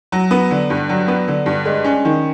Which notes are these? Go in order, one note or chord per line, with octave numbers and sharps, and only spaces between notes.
F#3
B3
D3
G2
F#3
B3
D3
G2
G#3
C#4
D#3